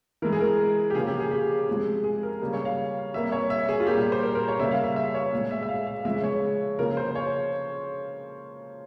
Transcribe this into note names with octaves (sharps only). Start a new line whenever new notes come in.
E3 G#3 A#4
G#4
A#4
G4
C#3 F3 A#3 G#4
G4
G#4
G4
C3 F3 G#3
G#4
A#4
C#3 G3 A#3
C#5
F5
C3 G3 A#3 E5
C#5
E5
G#4
F4
A#2 G3 A#3 G4
C5
A#4
A#4
C#5
C#3 G3 A#3 E5
F5
E5
E5
C#5
A#2 G#3
E5
E5
F5
F5
C#3 F3 G#3 E5
C#5
C#3 F3 A#3 A#4
C5
C#5